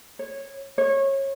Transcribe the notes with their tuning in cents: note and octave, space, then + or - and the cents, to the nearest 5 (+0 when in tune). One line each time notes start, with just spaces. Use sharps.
C#5 -15
C#5 -25